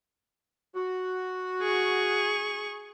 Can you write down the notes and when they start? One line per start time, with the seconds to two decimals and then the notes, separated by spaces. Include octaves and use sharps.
0.75 F#4
1.63 G#4 C#6